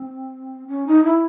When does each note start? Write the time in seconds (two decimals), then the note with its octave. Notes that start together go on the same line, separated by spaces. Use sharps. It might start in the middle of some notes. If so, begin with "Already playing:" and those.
Already playing: C4
0.68 C#4
0.87 D#4
1.04 E4